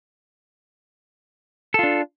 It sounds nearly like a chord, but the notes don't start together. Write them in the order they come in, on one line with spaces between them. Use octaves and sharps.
A4 F4 D4